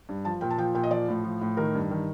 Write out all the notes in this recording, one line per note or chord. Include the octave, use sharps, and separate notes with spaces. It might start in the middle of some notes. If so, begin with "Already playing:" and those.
G2
F3 A5
A#2 G5
A5
F3 G5
A#2 G5
D#5
F3 D5
A2
F3
A2
D#3 A#4
G2
D#3